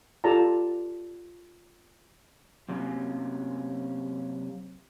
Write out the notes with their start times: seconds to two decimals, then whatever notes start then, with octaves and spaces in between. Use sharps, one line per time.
0.24 F4 G4 A4 D5 A5 A#5
2.69 F#2 C3 F#3 A#3 C#4